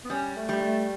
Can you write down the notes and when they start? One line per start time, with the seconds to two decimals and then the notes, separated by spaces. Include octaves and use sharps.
0.05 B3
0.10 G3 C#4
0.36 A3
0.49 G3
0.62 A3